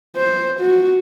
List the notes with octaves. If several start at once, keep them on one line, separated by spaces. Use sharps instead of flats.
C5
F#4